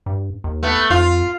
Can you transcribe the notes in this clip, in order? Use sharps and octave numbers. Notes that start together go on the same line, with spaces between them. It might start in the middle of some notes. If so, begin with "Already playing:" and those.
G2
D#2
A3 B3
F2 F4